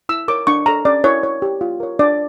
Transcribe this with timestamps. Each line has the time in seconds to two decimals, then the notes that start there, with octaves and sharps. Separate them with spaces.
0.09 E4 E6
0.28 A#4 C#5 D6
0.47 D4 C#6
0.66 A4 C#5 A#5
0.85 C#4 D5
1.04 E4 A#4 C#5
1.23 E4 C#5
1.42 G4 C#5
1.61 F4
1.80 A#4 C#5
1.99 D4 D5